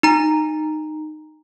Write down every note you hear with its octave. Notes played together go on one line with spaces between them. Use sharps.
D#4 A#5